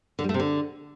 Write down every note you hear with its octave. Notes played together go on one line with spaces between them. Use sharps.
D3
G3
A3
C3
D3